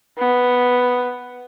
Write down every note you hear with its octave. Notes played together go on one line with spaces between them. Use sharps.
B3